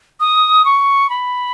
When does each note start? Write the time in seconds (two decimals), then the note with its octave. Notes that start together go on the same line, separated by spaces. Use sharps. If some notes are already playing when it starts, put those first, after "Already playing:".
0.20 D#6
0.65 C#6
1.10 B5